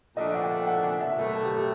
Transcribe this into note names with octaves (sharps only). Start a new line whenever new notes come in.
A#2 F3 A3 D4 D#5
F#5
G5
F#5
G#5
E5
B2 F#3 A3 A#4
A4
G4
G4